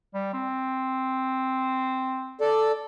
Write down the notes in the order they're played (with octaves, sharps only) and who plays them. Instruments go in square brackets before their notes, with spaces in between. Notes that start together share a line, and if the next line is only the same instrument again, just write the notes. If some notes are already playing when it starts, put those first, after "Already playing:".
[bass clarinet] G3
C4
[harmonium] A4 D5